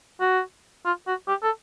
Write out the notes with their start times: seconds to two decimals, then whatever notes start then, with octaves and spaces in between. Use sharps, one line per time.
0.20 F#4
0.85 F4
1.07 F#4
1.28 G4
1.43 A4